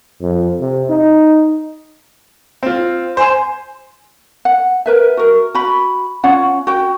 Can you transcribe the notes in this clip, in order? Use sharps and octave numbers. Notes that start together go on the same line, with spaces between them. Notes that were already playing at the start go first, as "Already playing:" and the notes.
F2
C3
D#4
C4 F4
C5 G#5 C6
F#5
A#4 B4 E5
F#4 A#4
F#4 B5
C#4 F4 C#5 F#5
F#4 G5